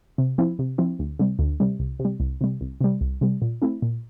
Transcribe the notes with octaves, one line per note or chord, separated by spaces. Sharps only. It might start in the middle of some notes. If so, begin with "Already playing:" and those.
C3
F3 C4 E4
C3
F3 C4 E4
D2
C3 G3
D2
C3 G3
C2
C3
G3
C2
C3 G3
C2
C3 G3
C2
C3 G3
A#2
A3 C4 E4
A#2